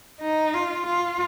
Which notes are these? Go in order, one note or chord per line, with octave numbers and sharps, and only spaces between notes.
D#4
F4
F4